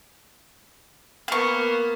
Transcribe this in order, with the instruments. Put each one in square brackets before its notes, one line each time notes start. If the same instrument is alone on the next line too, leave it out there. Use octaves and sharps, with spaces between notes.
[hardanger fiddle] A#3 B3 [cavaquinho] F5 C#6